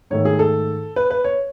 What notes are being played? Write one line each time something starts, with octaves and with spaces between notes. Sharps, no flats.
G#2 D#3 A3 C#5
G#4
A4
B4
B4
C#5